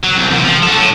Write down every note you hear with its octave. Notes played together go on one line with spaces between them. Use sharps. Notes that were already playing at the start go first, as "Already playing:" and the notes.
F#3
C2
E2 C3
F3
F#4 A4
A2